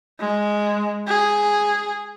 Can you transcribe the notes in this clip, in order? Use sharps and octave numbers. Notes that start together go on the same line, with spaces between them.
G#3
G#4